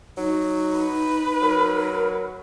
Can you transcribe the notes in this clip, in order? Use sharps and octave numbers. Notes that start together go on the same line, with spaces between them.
F#3 D#4
B4
F#3 A#4